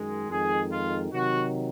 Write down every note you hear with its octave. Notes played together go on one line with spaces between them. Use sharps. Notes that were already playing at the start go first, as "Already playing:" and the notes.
Already playing: F#2 D#3 G#3
F2 D#3 G#3 G#4
F4
C3 D#3 F#3 F#4